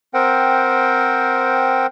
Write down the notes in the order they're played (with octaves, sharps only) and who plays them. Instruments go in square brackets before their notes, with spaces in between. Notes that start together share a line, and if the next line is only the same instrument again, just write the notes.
[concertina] C4 A#4 C5 F#5 G5